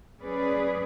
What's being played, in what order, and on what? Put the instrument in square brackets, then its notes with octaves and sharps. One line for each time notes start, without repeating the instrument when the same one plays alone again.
[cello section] F#3 C#4 G#4 B4 D5